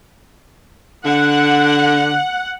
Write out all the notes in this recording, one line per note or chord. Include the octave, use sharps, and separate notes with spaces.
D3 F#5